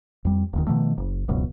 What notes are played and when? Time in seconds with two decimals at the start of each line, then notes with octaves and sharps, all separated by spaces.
0.25 F2 G3
0.53 D#1 D2 D#3
0.67 B2 D#3 F3 A3
0.97 F#1
1.28 D1 C#2 F#2 B2